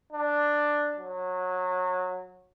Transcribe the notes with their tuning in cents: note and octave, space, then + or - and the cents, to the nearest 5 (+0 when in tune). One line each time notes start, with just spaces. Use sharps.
D4 +5
F#3 -20